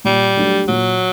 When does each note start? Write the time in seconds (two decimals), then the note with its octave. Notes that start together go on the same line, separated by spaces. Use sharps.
0.04 A#2 G3
0.36 F#3 A3 D4 G4
0.68 A#2 F#3